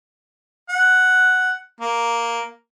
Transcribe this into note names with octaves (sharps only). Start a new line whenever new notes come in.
F#5
A#3